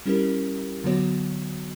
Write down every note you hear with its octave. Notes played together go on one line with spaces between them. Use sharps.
G3 C#4 E4 G4 A#4
D3 F#3 B3 F#4 C#5